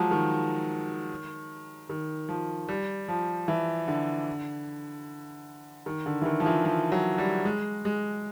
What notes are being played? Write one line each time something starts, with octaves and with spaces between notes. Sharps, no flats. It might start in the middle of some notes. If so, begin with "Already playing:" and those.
Already playing: F3 F#3 G#3
D#3
D#3
F3
G3
F3
E3
D3
D#3
D3
E3
D#3
F3
E3
F3
F#3
G3
G#3
G#3